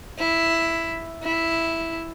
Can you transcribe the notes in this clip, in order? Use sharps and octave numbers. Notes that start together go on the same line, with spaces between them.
E4
E4